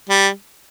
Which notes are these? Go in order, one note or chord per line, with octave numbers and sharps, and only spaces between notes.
G3